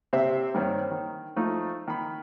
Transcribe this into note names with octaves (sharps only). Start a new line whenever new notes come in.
C3 C5 E5
G2 D#3 C4 C#4
D#3
F3 A3 D#4
D#3 B5